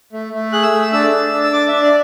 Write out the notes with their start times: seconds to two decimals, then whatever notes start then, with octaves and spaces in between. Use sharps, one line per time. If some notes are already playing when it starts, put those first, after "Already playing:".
0.13 A3
0.33 A3
0.52 G#4 F#6
0.63 E6
0.73 A3
0.93 D4 E6
1.13 D4
1.33 D4
1.44 E6
1.52 D4 D6
1.68 D4 E5
1.82 D5